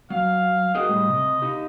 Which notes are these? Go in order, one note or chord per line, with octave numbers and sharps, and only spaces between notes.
F#3 F5
F#4 G#4 A#4 D#5
A2 G3
C3
D#4 G4